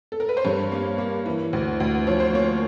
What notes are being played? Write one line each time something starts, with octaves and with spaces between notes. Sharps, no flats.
A4
A#4
B4
C5
G2 C#5
A#3
A#3
E3
D2
D2
F3 C#5
C5
A#3 C#5